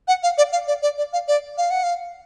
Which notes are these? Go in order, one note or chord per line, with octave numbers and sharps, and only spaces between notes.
F#5
F5
D5
F5
D5
D5
D5
F5
D5
F5
F#5
F5